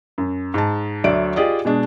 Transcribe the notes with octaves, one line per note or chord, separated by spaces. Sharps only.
F#2
G#2 A5
D2 F#3 D5 E5 D7
F4 G4 G#4 D5 D#5
B2 G#3 D4